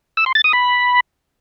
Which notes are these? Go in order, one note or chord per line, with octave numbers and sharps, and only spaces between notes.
E6
C6
A6
D#6
B5